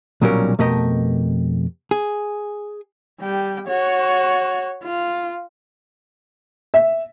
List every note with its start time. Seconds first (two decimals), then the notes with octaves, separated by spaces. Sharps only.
0.21 B1 A#2 F#3 G3 C#4 A#4
0.59 F2 B2 A3 G4 A#4 D#5
1.91 G#4
3.21 G3 G5
3.68 F#4 C#5
4.83 F4
6.74 E5